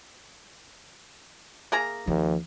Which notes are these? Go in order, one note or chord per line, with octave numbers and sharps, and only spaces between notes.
A#3 G#4 A#5
D#2 F3